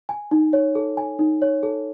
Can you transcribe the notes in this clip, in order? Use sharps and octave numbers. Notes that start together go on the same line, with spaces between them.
G#5
D#4
C#5
A4
G#5
D#4
C#5
A4